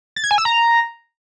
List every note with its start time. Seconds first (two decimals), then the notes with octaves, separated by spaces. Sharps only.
0.16 A6
0.24 G#6
0.31 G#5
0.38 E6
0.45 A#5